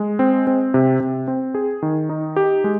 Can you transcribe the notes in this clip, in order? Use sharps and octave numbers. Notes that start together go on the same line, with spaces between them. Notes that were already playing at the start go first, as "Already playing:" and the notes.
Already playing: G#3
C4
C4
C3
C3
C4
G#4
D#3
D#4
G4
G#3